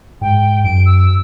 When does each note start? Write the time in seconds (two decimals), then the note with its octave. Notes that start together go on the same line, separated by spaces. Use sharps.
0.21 G#2 G5
0.64 F#2 D7
0.86 E6